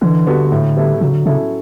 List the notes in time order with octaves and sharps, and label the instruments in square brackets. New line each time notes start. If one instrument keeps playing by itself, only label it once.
[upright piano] D3 [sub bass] E3
[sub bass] D3 [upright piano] G3 B3 F#4 A4
[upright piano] A2
G3 B3 E4 A4
[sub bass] C#3 [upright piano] F#3
[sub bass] D3
[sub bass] C#3 [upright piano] C#4 E4 A4